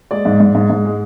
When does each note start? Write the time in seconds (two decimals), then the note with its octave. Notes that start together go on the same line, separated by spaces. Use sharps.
0.11 G#3 D5
0.25 G#2
0.40 G#2
0.55 G#2
0.70 G#2
0.85 G#3